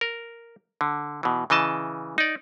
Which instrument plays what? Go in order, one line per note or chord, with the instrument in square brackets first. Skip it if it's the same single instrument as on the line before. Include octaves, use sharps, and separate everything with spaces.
[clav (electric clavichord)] A#4
D3
B2 E3
C#3 E3 D#5 A5
D#4 D5